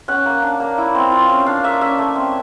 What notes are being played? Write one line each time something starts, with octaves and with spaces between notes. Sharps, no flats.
C#4 F#5
A#3
D4
A#3
E4
C4
F4
C#4
D4 F5
A#3 E5
C#4 E5
A3
C4